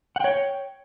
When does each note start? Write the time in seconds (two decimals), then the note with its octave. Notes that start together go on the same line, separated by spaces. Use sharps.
0.16 F#5
0.20 G5
0.24 C#5